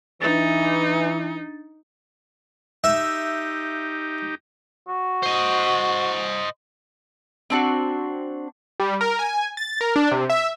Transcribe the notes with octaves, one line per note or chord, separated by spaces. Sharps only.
E3 D4 D#4 A6
D#4 G4 E5
F#4
C5 D#5
C4 D4 F#4
G3
A#4
G#5
A6
A#4
D4
C3
E5